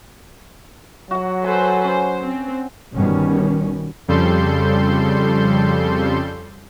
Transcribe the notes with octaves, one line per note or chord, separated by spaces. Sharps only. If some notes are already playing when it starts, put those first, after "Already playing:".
F#3 F#4 F#5
A4 B4 C5 G#5
C#4 C5
C4
G1 B2 D#3 G3 C#4
F2 C#3 G3 A4 C6 G6